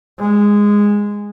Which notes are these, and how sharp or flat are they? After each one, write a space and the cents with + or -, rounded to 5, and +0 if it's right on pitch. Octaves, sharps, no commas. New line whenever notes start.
G#3 -10